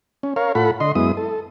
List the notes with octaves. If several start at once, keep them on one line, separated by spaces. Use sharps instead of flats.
C#4
A#4 C#5 F5
A2 F4 A4 F#5 B5
D3 D#5 C6
F#2 G#3 B3 E4 D#6
A4